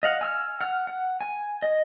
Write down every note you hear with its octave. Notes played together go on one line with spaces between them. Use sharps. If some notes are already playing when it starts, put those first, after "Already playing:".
D#5 F5 F#5
G#5 E6 F6
F#5 F6
F#5
G#5
D#5